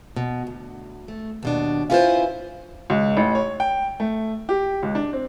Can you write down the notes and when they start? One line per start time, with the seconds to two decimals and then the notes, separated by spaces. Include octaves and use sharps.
0.16 B2
0.47 D2
1.08 A3
1.43 D#2 B2 D4
1.90 C#4 E4 F4 A4 B4 C5
2.90 C#2
3.17 A1
3.35 C#5
3.60 G5
4.00 A3
4.49 G4
4.83 C#2
4.95 D4
5.13 C4